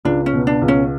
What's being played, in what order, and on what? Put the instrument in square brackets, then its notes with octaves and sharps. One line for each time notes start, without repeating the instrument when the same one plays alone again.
[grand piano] C#2 [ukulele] D4
[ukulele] C#4
[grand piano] B2
[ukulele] D4
[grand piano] C#2
[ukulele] C#4